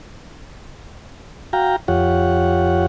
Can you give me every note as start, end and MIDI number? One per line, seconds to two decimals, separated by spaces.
1.53 1.76 66
1.53 1.76 77
1.53 1.76 79
1.53 1.76 82
1.88 2.86 41
1.88 2.86 65
1.88 2.86 67
1.88 2.86 73
1.88 2.86 78